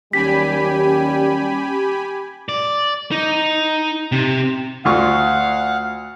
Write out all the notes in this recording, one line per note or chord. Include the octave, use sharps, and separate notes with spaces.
D#2 F#3 G3 C#4 G4 G#5 B5 B6
D5
D#4
C3
D2 F4 F5 F#5 C#6